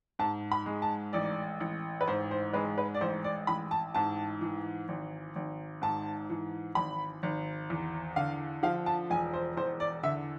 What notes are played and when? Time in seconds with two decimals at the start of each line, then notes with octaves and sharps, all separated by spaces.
0.19 G#2 A5
0.52 B5
0.66 G#3
0.82 A5
1.13 A1 D5
1.60 A1
2.01 B4
2.08 G#2 C5
2.31 C5
2.53 G#3 B4
2.78 B4
2.94 D5
3.01 A1 C5
3.24 D5
3.47 A1 B5
3.71 A5
3.94 G#2 A5
4.41 E3
4.88 G#1
5.36 G#1
5.82 G#2 A5
6.30 E3
6.75 G#1 B5
7.23 G#1
7.70 E2
8.16 D3 F5
8.63 F3 F5
8.86 A5
9.10 E1 G#5
9.34 C5
9.57 E2 C5
9.80 D5
10.03 D3 E5